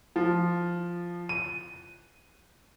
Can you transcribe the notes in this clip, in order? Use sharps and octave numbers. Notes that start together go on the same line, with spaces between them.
F3
D#7